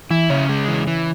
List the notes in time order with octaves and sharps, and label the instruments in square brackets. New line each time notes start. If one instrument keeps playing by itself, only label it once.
[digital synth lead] E3 [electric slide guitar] E4
[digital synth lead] C#3 [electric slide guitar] C#4
[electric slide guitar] G#3
E3
E3